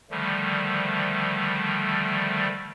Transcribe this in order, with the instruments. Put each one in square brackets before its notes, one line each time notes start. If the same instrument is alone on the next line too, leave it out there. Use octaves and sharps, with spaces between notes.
[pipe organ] D3 D#3 F3 G3 A3